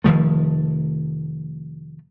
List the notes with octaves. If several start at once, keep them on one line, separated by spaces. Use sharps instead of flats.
F1 D#3 F3 A3